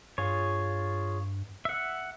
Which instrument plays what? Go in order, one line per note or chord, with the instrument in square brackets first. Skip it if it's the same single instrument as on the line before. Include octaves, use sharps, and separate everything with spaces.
[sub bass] G2 [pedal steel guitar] F4 G#4 C#5
[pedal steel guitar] E5 F#5